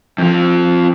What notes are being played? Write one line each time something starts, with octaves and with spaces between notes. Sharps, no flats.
F2 F3